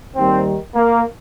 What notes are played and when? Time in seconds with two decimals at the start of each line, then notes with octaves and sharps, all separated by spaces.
0.16 D#2 D#3 G3 C4
0.75 A#3